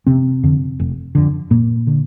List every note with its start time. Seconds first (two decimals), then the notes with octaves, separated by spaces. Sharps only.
0.07 F1 C3 C4
0.44 F2 D3
0.80 F1
1.15 F2 D3
1.50 F1 A#2 A#3
1.87 D3